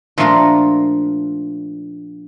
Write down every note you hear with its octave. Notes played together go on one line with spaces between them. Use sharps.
A#2 F3 A3 D4 F4 A#4